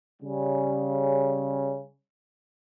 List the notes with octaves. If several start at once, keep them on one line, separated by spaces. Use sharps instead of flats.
C#3 G3